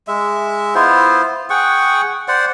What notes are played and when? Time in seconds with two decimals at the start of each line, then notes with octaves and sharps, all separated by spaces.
0.08 G#3 E5
0.75 B3 E4 F4 C5
1.50 G#4 F#5 G5 C#6
2.28 C5 D5 F#5